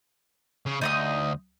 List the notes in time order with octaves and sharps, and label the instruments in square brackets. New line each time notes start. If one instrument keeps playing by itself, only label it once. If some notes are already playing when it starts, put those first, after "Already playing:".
[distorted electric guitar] C#3
[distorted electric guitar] D2 [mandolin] D#4 D#5 D#6